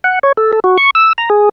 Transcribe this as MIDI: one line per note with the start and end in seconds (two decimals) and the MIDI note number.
0.04 0.19 78
0.23 0.32 73
0.37 0.53 69
0.53 0.60 69
0.64 0.77 66
0.78 0.90 85
0.95 1.13 88
1.18 1.29 82
1.30 1.49 68